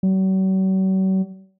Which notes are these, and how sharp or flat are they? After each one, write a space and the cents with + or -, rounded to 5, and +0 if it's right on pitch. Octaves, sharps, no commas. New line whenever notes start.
F#3 +45